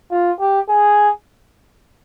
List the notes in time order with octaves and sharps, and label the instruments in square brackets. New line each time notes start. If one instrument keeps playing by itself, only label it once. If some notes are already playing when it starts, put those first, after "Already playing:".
[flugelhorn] F4
G4
G#4